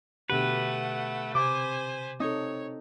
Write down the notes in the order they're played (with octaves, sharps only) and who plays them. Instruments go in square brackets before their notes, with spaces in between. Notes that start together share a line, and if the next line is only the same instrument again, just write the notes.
[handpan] B2 D3 G4 [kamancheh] A3 F#5 [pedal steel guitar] B4
[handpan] C3 [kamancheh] C5 G#5 [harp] D6
[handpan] C4 A4 [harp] D#4 [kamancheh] C#5